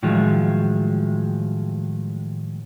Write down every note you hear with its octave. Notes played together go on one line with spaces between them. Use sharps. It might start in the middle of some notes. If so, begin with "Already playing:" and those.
A2 D#3 F3 F#3 G#3